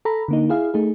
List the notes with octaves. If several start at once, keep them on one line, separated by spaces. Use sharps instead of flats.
A4 A#5 B5
D3 A#3 D#4
E4 G#4 F5
A3 D#4 G#4